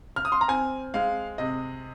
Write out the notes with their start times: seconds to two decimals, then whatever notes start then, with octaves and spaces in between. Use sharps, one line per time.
0.16 F6
0.25 D#6
0.32 C6
0.41 A#5
0.48 C4 G#5
0.94 G#3 F5
1.38 C3 D#5